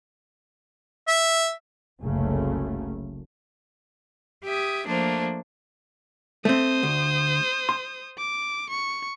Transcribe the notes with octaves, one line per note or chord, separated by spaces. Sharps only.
E5
F#1 C2 F#2 C#3 A3
G4 E5 D#6 G#6
F3 A3 A#3 D4 C5
A3 C4 C5 D#6
D2
C6
D6
C#6